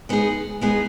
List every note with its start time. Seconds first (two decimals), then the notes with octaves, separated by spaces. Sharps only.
0.09 G#3 B3 D#4 G#4
0.61 G#3 B3 D#4 G#4